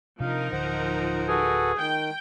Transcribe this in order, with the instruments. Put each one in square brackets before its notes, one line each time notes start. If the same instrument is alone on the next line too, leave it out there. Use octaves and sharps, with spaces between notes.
[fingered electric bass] C3 D4 [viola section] F3 D#4 A#4 [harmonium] F5
[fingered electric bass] D1 D3 [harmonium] C5 F#5
[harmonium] F#4 A4 B4 [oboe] G#4
[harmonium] D#3 [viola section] G5